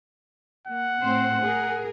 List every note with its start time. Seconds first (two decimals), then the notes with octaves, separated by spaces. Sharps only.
0.67 A#3 F#5
1.03 A2 C4 C5
1.44 G#4 A#4